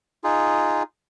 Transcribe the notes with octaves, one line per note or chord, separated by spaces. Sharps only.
D#4 F4 G#4